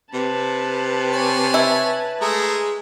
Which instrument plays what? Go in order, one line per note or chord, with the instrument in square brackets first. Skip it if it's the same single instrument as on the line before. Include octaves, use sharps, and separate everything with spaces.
[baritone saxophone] C3 [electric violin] B4 A5
[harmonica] C#5 G#5
[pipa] E4
[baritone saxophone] G#3 [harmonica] A3 G#4 A#5